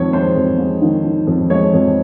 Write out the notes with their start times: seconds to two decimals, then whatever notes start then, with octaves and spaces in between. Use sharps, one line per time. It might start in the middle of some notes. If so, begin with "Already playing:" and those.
Already playing: F2 D#3 G#3 C#5
0.13 G#3 C5
0.36 F2
0.58 G#3
0.82 D#3
1.05 D#3
1.27 F2
1.50 G#3 C#5
1.73 F2